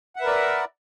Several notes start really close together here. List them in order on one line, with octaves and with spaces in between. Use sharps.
F#5 E5 B4 A#4 D5